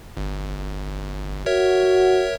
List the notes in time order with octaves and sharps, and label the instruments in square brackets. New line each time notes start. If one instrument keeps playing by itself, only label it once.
[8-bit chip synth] G1
[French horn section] F#4 [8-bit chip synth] A#4 C#5 E5